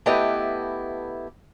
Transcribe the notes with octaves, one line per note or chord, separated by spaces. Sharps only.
A3 B3 E4 G4 B4 D#5